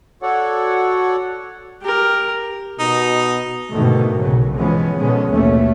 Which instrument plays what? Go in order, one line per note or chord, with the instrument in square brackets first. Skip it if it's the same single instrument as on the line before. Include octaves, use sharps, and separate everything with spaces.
[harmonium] F#4 A4 C#5 D5 F#5
[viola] G4 A#4
[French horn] B2 [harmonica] D#4
[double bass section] G#2 B2 D3 D#3 A3
B1 C#3 F#3
E3 F3 G#3 B3 C#4
B2 D3 D#3 G#3 B3 C#4
A1 D#2 B2 A3 C#4